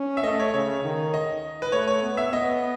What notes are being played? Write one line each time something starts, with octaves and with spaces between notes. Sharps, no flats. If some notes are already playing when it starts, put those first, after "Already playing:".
Already playing: C#4
E5
A3 D#5
C#5
C#3 C#5
D#3
D#5
B4
A3 C#5
C#5
B3
E5
B3 D#5